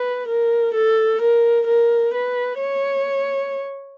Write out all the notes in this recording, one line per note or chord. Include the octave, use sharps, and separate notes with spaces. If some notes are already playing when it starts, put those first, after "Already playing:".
Already playing: B4
A#4
A4
A#4
A#4
B4
C#5